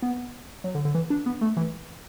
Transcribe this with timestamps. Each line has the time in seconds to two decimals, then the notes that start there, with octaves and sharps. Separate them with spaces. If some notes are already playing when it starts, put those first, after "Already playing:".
0.02 B3
0.64 F#3
0.75 D3
0.85 D3
0.95 E3
1.10 D4
1.26 B3
1.41 A3
1.57 E3